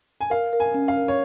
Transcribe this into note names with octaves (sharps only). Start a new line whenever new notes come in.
G#5
A#4 F5
A#4
G#5
C#4
F5
A#4
C#5